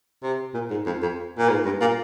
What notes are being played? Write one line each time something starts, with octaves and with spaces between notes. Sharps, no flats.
C3
A#2
G#2
F2
F2
A#2
G#2
G2
A#2